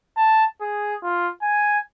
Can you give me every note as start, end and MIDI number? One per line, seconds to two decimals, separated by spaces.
0.17 0.45 81
0.61 0.95 68
1.03 1.29 65
1.42 1.79 80